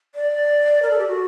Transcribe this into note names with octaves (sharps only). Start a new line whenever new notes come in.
D5
A#4
A4
G4
F#4